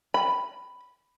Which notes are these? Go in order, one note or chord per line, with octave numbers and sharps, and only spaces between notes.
B5